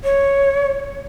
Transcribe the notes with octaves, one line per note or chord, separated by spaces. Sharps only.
C#5